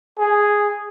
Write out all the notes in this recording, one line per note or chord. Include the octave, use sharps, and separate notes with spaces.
G#4